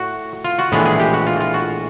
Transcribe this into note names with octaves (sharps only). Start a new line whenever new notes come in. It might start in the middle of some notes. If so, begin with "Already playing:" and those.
Already playing: A2 F#4
F4
F#4
A#1 A2 E3 G#3 B3 G#4
G#4
G4
F#4
F4
F4
F#4